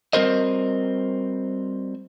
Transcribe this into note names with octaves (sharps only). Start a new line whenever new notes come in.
G3 C4 F#4 A#4 C5 D#5